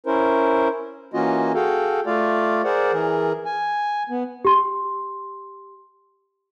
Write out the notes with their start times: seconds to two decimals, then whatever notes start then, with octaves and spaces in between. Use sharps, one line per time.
0.06 C#4 E4 A#4 C5
1.14 E3 A#3 C#4 F4 F#4 D#5
1.55 F#4 G#4 A4 F5 G5
2.06 A3 F4 D5 F5
2.64 G#4 A#4 C5 D5 F#5
2.92 E3 G#4 A#4
3.46 G#5
4.10 B3
4.45 G4 C6